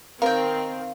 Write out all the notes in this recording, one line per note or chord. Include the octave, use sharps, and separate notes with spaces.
D#3 C4 A#4 F5 G5